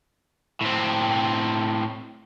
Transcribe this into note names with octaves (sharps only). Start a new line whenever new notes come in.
A2 C4